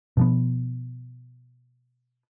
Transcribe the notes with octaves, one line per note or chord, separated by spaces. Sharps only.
B2 F3 B3